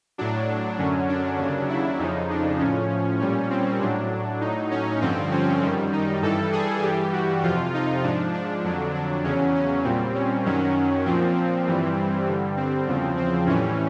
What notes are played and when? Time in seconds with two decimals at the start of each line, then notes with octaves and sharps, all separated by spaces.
0.18 A2 F#3 D4
0.78 F#2 D3 F#3 C#4
1.09 D4
1.39 D#2 C#3 F#3
1.69 E4
1.99 F2 C#3 F3 D#4
2.30 D4
2.59 A2 F3 C#4
3.20 A#2 G3 C#4
3.50 C4
3.81 A2 F#3 D4
4.41 A2 F#3 D#4
4.71 C#4
5.01 G2 D3 F3 C4
5.31 C#4
5.62 F#2 D#3 G3
5.93 D#4
6.22 G2 E3 G3 A4
6.53 G#4
6.82 G2 E3 G3 G4
7.13 F#4
7.43 F2 C3 F3 F4
7.74 D#4
8.04 G#2 F3 D4
8.34 D4
8.64 F2 D3 F#3
8.94 D4
9.24 E2 C#3 F#3 C#4
9.55 C#4
9.84 A#2 G3 C4
10.15 C#4
10.46 F#2 D#3 F#3 C#4
11.05 A#2 F3 C4
11.35 C4
11.67 G2 E3 G3
12.27 G2 D3 G3
12.57 C4
12.87 E2 C#3 F3
13.17 C4
13.47 A2 E3 G3 C#4